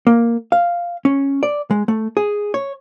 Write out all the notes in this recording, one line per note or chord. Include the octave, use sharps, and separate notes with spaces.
A#3
F5
C#4
D5
G#3
A3
G#4
C#5